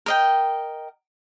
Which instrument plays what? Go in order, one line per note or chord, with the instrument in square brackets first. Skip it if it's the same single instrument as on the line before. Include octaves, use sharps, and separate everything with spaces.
[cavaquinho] A#4 D#5 G5